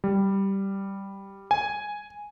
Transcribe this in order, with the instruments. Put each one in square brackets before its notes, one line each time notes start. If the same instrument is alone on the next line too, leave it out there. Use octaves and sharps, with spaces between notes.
[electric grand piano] G3
G#5